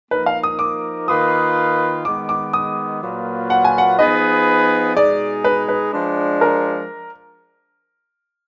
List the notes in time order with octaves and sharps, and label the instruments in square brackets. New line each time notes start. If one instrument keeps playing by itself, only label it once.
[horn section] F3 A#3 D#4 A#4 [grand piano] B4
[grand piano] F5
D#6
D6
[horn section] D#3 A#3 F4 B4 [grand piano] D#6
[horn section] D#3 G#3 B3 [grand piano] D6
[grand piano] D6
D#6
[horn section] A#2 F#3 A#3 F4 B4
[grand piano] F#5
G#5
F#5
[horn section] F3 B3 D#4 G#4 B4 [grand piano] D#5
[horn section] B2 G#3 D#4 G#4 [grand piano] D5
[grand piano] B4
B4
[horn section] F3 G#3 D4
[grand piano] A#4